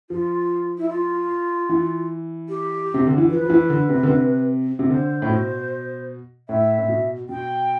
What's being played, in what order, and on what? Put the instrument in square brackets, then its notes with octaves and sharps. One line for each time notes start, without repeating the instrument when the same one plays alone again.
[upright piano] F3 [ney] F4
[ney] E4
F4
[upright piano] E3
[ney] G4
[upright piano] C3
D3
E3
[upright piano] F3 [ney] B4
[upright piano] F3
E3
D3
C3
D3
C3
C3
[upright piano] D3 [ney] C5
[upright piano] A2
B2
[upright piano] A2 [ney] E5
[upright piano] A2
B2
[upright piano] B2 [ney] G5